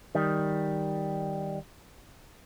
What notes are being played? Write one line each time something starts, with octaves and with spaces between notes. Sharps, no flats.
D#3 G3